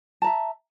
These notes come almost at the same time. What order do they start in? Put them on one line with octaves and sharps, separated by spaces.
A5 A#5 E5